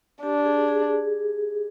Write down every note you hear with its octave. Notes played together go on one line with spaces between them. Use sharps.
D4 G4
G#4
G#4